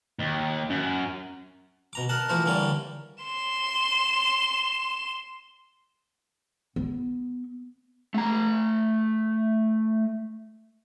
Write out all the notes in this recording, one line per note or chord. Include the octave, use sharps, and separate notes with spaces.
D#2
F#2
B2 A#5 D6
A#4 D#5 F#5 A5
E3 F3 A3 A#4 C5
D3 E3 G3 A#3 C#5 D5
C6 E7
B3
A3 A#5